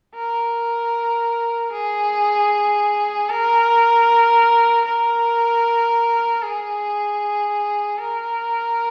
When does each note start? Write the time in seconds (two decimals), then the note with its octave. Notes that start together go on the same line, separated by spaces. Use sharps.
0.15 A#4
1.72 G#4
3.29 A#4
4.85 A#4
6.42 G#4
7.98 A#4